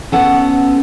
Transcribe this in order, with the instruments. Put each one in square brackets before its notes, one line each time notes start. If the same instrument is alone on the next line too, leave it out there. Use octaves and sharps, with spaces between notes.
[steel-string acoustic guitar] B3 A4 F#5 [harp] C#4